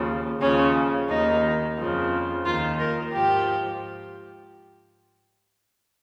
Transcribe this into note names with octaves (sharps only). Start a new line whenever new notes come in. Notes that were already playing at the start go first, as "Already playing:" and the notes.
Already playing: D#2 C#3 F3
D#2 C#3 F3 C#4
D#2 D#3 D#4
F2 C#3 F3
D#2 D#3 F4
A#4
G#2 F3 G4